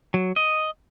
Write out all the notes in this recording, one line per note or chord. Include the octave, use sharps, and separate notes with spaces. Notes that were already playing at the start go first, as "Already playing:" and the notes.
F#3
D#5